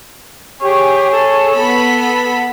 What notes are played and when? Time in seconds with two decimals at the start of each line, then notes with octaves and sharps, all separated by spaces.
0.62 G4 G#4 C#5
1.11 A4
1.55 B3 A4 B5